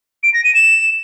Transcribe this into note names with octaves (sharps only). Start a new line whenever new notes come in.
D7
A#6
D#7
E7